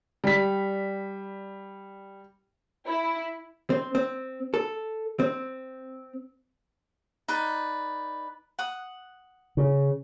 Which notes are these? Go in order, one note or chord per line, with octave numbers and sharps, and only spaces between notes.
G3 B6
E4
C4
C4
A4
C4
D#4 B4 D5
F#5 D#6
C#3